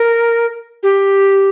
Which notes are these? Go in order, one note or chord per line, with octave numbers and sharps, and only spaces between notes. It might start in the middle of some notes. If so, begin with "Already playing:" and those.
Already playing: A#4
G4